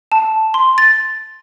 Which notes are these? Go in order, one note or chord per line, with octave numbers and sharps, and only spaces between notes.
A5
C6
A6